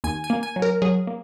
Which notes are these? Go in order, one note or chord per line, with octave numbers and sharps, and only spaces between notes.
D#2 G#5
G#5
A#3
G#5
F#3
A#4
F#3 G#4
A#3